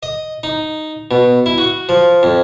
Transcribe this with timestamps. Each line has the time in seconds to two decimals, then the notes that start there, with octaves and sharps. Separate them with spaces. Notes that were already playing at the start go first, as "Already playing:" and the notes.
0.03 D#5
0.43 D#4
1.11 B2
1.46 E4
1.58 F#4
1.89 F3
2.23 F2